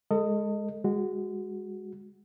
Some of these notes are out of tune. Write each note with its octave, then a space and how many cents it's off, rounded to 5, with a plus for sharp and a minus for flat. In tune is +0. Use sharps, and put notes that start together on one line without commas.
G#3 +0 A4 +35 D#5 +0
G#3 -20 F#4 +0